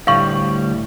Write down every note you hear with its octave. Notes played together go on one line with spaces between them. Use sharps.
D2 A2 G3 F5 C#6